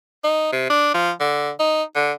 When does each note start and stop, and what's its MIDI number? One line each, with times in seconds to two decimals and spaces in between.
0.24 0.51 63
0.52 0.67 48
0.70 0.92 62
0.94 1.11 53
1.20 1.50 50
1.59 1.83 63
1.95 2.12 50